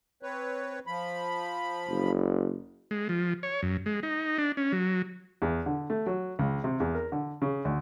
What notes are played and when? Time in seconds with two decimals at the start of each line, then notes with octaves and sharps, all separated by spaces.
0.23 C4 B4 C#5
0.87 F3 B5
1.89 F#1
2.91 G#3
3.09 F3
3.43 C#5
3.62 F#2
3.86 G#3
4.03 D#4
4.38 D4
4.57 C#4
4.73 F#3
5.42 E2
5.66 D3
5.90 A3
6.06 F#3
6.39 C#2
6.64 C3
6.80 E2
6.94 A#4
7.12 D3
7.42 C#3
7.65 D2